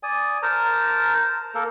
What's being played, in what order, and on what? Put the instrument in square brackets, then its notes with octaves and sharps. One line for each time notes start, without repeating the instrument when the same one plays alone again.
[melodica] D5 G#5 D#6
A#4 C5 A5 A#5
A#3 A4 A#4